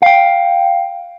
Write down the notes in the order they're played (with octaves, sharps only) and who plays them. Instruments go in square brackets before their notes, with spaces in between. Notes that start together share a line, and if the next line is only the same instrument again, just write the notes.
[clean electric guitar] F5 G5